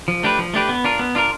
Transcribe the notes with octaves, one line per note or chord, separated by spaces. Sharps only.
F3
A3 D4 G4 B4
F3
A3 D4 G4 B4
B3
D4 F4 A#4
B3
D4 F4 A#4